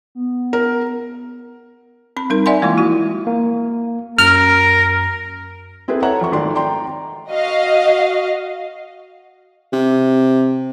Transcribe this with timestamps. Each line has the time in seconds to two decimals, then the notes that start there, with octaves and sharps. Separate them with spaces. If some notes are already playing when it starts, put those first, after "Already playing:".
0.15 B3
0.53 A#4
2.17 C4 B5
2.30 G3 C4 D#4 A#4
2.46 D5 E5 F#5 G#5 C6
2.62 E3 G#3 A#3 E4 F4
2.77 F3 E4 F#4
3.27 A#3
4.18 F#2 A#4 F6
5.88 C4 E4 G#4 A4 B4
6.02 A4 C#5 E5 F#5 A#5
6.21 F2 C#6
6.32 G#1 A3 D5 C6
6.55 D5 G5 A#5 C6
7.30 F#4 D#5 F5
9.73 C3